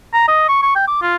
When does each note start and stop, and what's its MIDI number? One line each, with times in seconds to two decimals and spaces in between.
0.13 0.28 82
0.28 0.47 75
0.48 0.58 85
0.62 0.74 85
0.76 0.87 79
0.88 0.98 86
1.02 1.16 65